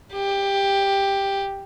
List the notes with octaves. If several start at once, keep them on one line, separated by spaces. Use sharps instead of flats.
G4